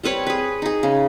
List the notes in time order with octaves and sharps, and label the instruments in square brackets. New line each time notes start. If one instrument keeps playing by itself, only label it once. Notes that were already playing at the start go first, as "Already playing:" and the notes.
[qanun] G3 C4 B4 C#5
G#4 B4
D#4 G#4
C#3